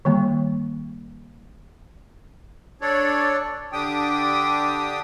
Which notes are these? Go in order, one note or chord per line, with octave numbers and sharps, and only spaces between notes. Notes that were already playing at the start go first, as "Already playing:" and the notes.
D#3 G3 A#3
D4 A4 C#5 D5
D3 D4 G4 G5 D#6